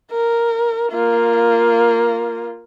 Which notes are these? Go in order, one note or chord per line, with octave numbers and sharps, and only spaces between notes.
A#4
A#3 F4